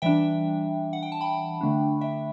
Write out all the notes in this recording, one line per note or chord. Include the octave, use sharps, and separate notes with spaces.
E3 G3 D4 E5 G5
F#5
G5
A5
G5 B5
D3 A3 D4
E5 G5